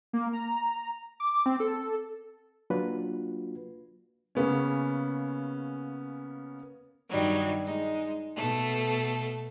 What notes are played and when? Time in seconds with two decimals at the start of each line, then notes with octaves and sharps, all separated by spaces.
0.13 A#3
0.33 A#5
1.20 D6
1.46 C4
1.60 A4
2.70 F#3 A#3 D4 F4 F#4 B4
4.35 C#3 A#3 B3 C#4
7.10 G2 D#3 F#3 G3 D#4
7.64 G#3 D#4
8.36 B2 A3 A4